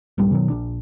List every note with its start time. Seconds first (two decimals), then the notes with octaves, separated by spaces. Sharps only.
0.18 D#1 A#1 G2 G3
0.31 B2 D#3 E3 F#3
0.50 A#1 D4